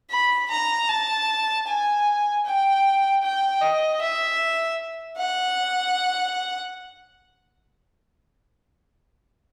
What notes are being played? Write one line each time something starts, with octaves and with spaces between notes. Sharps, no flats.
B5
A#5
A5
G#5
G5
G5
D#5
E5
F#5